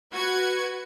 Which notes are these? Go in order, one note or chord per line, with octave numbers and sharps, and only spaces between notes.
F#4 B4 G#6 C#7